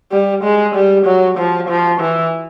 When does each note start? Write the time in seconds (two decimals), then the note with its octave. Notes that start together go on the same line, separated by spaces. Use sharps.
0.12 G3
0.44 G#3
0.75 G3
1.06 F#3
1.38 F3
1.69 F3
2.01 E3